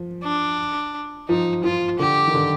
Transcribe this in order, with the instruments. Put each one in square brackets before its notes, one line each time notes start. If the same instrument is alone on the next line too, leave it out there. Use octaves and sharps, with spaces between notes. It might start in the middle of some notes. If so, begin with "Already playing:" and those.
Already playing: [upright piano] F3
[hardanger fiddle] D4
[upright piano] F3 [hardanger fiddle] D#4
[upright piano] F3 [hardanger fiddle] F4
[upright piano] D3 [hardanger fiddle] G4
[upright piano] D#3
D3